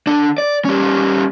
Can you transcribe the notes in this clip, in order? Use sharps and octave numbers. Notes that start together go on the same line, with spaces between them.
D3 D4
D5
G3 C#4